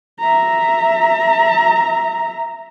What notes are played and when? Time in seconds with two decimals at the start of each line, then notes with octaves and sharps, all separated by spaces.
0.20 E5 A#5